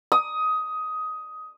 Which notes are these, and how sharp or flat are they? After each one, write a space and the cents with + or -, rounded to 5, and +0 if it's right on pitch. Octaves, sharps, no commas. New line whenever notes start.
D#6 +15